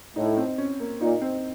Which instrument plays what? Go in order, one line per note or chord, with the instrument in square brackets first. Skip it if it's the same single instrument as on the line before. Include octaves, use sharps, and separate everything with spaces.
[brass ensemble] A2 [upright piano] D#4
[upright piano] C4
C#4
A#3
[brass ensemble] A#2 [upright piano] D#4
[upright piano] C4